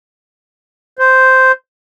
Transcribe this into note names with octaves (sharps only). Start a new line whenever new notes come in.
C5